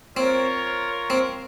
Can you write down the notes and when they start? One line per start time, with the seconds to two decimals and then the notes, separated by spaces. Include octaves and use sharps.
0.16 C4 F4 A#4 C#5
1.10 C4